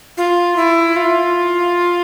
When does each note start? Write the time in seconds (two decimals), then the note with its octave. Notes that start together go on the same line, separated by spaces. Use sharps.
0.17 F4
0.57 E4
0.96 F4